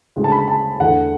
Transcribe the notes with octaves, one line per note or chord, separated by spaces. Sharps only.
D2 C#3 G#3
A5
B5
A5
E2 D3 A3 F#5